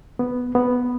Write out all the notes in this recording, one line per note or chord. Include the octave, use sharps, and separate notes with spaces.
B3
B3